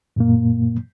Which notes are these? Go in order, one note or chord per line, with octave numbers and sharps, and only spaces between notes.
F#2 A#2 A#3